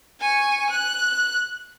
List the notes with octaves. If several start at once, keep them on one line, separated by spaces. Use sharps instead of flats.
G#5 C#6
F#6